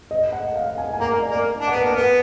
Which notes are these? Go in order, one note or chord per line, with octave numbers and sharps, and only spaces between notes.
D#5
F#5
F5
G#5
G#5
A#3 A#5
D5
A#3
D4
B3 F#5
A#3
F#5
B3